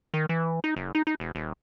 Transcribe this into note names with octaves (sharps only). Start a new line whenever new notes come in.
D#3
E3
D#4
F#1
D#4
D#4
E1
D#1